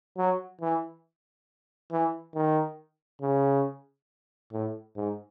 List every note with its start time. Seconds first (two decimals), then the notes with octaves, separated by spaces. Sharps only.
0.18 F#3
0.61 E3
1.92 E3
2.35 D#3
3.22 C#3
4.53 A2
4.96 G#2